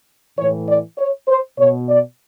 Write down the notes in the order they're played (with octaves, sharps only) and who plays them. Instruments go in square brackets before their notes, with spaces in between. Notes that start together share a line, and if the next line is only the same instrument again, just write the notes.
[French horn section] A2 E3 C#5
D5
C#5
C5
B2 C#5
D5